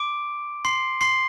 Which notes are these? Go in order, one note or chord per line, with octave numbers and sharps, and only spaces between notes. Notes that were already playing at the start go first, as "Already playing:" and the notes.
Already playing: C6 D6 D7
C6 C7
C6 C7